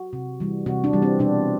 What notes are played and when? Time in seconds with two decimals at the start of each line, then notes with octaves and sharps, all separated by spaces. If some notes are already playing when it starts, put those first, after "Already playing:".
Already playing: F#4
0.13 C3
0.40 E3 G3
0.66 C3 F#4
0.84 D4
0.93 E3 G3
1.02 C4
1.19 B2 D4